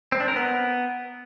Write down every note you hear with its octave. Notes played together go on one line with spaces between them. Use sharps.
C4
D4
A#4
B3